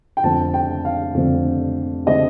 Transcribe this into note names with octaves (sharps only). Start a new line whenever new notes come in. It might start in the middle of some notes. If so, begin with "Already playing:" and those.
G5
F2 D3 A3 C4 A5
G5
F5
F2 D3 A3 C4
D3 A3 C4 D#5